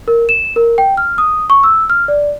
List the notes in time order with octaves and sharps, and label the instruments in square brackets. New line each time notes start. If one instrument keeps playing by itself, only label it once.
[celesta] A#4
E7
A#4
G5
F6
D#6
C#6
E6
F6
D5